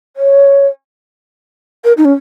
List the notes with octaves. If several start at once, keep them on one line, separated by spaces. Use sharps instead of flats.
C#5
A#4
D#4
C#4